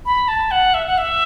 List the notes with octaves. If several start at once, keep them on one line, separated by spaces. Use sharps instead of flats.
B5
A5
F#5
E5
F#5
E5